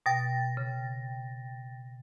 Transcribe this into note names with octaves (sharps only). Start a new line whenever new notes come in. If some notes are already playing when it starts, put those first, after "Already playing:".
B2 G5 A6 A#6
C#3